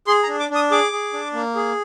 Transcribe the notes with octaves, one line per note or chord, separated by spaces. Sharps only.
G#4 C6
A#5
D4
D6
D4 D#6
G#4 D6
G#4
D4
A#3
G#4